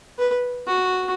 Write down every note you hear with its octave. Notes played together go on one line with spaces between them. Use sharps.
B4
F#4